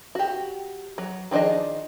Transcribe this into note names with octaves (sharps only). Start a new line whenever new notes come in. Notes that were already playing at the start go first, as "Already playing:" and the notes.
F#4 G4
F#3
D#3 F3 D4 G#4 D#5